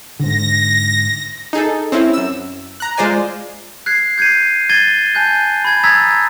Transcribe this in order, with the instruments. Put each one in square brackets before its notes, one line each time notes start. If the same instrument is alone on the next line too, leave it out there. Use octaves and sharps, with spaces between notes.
[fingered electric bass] G#2 D3 [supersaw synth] A#6
[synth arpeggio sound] D#4 G#4 A4
C4 C#4 E4
F#2 E6
A#5 F#6
G#3 F4 C5 D5 G#5
[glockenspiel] F#6 G#6 C7
G6 G#6 C7 C#7 D#7
G#6 A6 D#7 G7
G#5 A5 F#6 G6
B5 G#6
A#5 D#6 E6 G#6 A6 B6